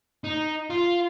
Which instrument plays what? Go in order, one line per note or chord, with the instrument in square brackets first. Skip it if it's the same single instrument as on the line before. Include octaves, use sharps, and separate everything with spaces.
[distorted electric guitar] D#4
F4